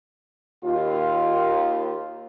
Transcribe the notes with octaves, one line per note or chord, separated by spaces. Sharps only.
D#2 F4